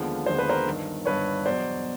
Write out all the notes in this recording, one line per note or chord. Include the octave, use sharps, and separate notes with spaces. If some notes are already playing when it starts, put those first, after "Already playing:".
Already playing: D#2 D3 F3 G#3 B3
D#2 D3 F3 G#3 B3 C5
B4
A#4 C5
G1 G2 D#3
G1 G2 D#3 B4 C#5
E2 B2 F#3 C5 D5